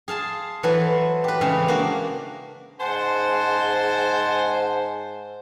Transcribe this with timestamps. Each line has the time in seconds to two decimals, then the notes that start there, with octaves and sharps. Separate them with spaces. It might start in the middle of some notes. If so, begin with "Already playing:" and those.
0.08 G#4 F5 A5 C6
0.63 E3 F#3 A4 B4 C5 G#5
1.24 G4 B4
1.41 C#3 E3 G#3 C4 C#4
1.68 A#3 D4 F#4
2.80 G#2 C5 F#5 G#5 A5